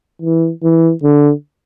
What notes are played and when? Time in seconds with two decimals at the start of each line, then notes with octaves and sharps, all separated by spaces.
0.22 E3
0.63 E3
1.03 D3